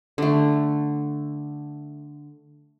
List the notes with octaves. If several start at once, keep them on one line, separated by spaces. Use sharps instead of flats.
D3 A3